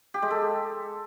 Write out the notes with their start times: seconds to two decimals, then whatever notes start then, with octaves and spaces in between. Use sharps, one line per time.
0.14 G4
0.22 G#3
0.31 A4